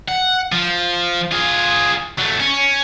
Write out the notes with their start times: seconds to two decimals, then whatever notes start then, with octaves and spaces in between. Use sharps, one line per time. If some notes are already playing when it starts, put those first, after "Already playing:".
0.09 F#5
0.52 F3
1.32 F4 G#4
2.18 F#3 A3
2.40 C#4